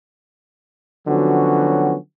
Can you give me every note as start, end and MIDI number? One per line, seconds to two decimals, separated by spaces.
1.08 1.96 50
1.08 1.96 53
1.08 1.96 54
1.08 1.96 59
1.08 1.96 61
1.08 1.96 66